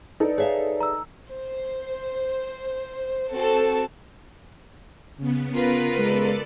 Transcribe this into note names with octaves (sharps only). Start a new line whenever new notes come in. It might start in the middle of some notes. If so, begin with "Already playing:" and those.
D#4 A4 B4 D5
G#4 C#5 E5 F5
A#5 E6
C5
C4 F#4 A4
C#3 B3
F4 A#4 B4
G#3 A4 D5